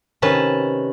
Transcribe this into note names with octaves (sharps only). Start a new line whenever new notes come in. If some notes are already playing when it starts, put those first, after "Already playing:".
C3 D#3 C#4 B4 A5